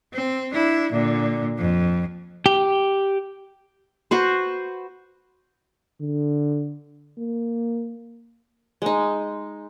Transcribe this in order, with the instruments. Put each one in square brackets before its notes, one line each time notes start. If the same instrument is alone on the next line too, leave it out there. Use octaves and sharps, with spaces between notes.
[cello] C4
D4 E4
A#2 D3
F2
[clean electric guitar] G4
[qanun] F#4 B4 C5
[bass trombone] D3
A#3
[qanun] G#3 D#4